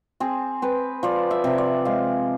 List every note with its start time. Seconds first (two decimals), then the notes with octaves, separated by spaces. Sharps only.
0.20 C4 G#4
0.62 C4 B4
1.03 F3 D5
1.31 E5
1.44 C3
1.58 D5
1.85 G#3 F5